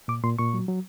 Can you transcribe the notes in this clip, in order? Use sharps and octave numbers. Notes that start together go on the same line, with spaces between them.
A#2 D6
A#2 C6
A#2 C#6
F#3
F#3